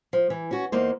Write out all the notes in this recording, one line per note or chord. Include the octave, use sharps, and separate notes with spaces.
F3
E3
C#4 F#4
E2 A#3 D#4 C5